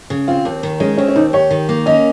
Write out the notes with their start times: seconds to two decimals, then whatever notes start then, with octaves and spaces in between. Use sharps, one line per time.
0.10 C#3
0.28 C4 F4
0.45 D#2
0.63 D#3
0.80 G#3 C#4
0.98 C4 C#4
1.08 C#4
1.16 D#2 D#4
1.33 G4 C#5
1.51 D#3
1.69 A#3
1.86 C#4 D#5